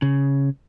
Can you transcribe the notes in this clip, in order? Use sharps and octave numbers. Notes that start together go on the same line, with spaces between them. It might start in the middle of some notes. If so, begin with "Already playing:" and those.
C#3